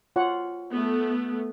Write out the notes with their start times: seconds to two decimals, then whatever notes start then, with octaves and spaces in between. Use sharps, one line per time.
0.16 F4 C#5 F#5
0.70 A3 B3